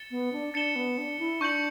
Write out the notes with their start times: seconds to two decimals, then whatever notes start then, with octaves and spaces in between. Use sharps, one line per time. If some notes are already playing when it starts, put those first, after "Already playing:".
Already playing: A6 C#7 E7 G7
0.11 B3
0.33 D4
0.54 D4 A6 C#7 E7 G7
0.76 B3
0.98 D4
1.19 E4
1.41 D4 C#6 G6 C#7 F#7